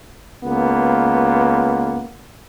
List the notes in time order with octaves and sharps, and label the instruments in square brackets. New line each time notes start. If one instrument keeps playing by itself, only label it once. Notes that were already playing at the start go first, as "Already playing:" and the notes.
[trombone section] C#2 A#3 B3